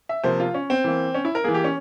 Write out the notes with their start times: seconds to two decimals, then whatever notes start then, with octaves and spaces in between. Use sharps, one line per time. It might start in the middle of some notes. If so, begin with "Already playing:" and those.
0.09 E5
0.24 C3 F3 A#3 C5
0.40 F4
0.54 C#4
0.70 C4
0.84 E3 A#3
1.14 C#4
1.25 E4
1.35 A#4
1.44 E3 A#3 G#4
1.54 G4
1.64 C#4